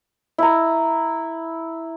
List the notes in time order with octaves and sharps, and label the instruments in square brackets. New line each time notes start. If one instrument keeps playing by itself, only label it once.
[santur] E4 A#5